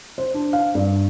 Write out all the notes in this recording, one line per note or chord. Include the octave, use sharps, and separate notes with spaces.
C5
D4
F5
G2